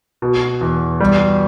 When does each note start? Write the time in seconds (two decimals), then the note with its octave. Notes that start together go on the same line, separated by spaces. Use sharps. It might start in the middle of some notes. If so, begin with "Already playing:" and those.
0.22 B2
0.61 E2
1.00 G3